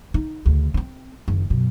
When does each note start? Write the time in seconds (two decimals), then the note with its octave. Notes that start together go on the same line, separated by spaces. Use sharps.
0.14 D#4
0.46 D2 C#3
0.74 C4 C#4
1.28 F#1 D#3
1.50 F#2 B2